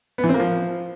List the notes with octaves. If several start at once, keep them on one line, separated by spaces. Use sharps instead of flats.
B3
E3
C4
A#3
F3